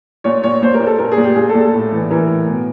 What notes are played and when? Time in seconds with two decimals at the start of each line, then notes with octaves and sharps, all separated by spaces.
0.24 A#2 C#5
0.44 A#2 C#5
0.62 A#2 C5
0.74 A#4
0.80 A#2
0.86 A4
0.99 A#2 A#4
1.12 G#4
1.17 A#2
1.24 G4
1.36 A#2 G#4
1.49 A4
1.55 A#2
1.60 A4
1.74 A2
1.92 E3
2.10 E3 A#4
2.28 A2
2.47 B2